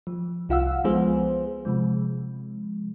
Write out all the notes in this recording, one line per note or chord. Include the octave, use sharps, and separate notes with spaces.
F3
C2 F4 F5 F#5 E6
F3 G#3 B3 F4 G#4 C5
C3 F3 G#3